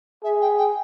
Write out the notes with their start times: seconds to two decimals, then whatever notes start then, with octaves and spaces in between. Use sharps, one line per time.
0.24 G#4 E5
0.41 G5
0.58 G5